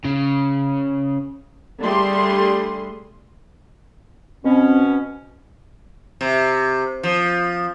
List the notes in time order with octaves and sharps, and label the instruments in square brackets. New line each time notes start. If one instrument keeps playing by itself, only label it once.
[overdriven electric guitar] C#3
[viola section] D3 G3 A3 G#4 C6
[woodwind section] B2 C#4 [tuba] C4
[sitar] C3
F3